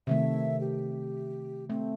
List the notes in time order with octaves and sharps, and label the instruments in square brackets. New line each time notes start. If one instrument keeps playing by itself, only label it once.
[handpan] C3 D#3 A3 [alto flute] E5
[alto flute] G4
[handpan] A3 [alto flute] C4